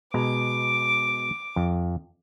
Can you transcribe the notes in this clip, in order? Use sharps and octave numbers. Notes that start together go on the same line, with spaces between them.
B2 G#3 A#5 D6
F2